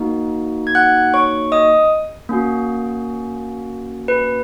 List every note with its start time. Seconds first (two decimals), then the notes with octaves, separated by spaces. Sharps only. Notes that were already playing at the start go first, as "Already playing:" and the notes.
Already playing: A#3 D#4 F#4
0.67 G#6
0.75 F#5 F#6
1.14 C#5 C#6
1.52 D#5 D#6
2.29 A#3 C#4 F#4
4.08 B4